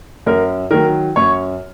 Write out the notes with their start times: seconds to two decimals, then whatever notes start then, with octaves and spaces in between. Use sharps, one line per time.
0.26 F#2 A#4
0.71 D#3 F#3 A#4
1.16 F#2 C#5